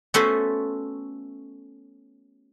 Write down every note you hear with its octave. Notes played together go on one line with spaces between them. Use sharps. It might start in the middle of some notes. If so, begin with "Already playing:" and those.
A3 B3 C#4 F#4 A4 C5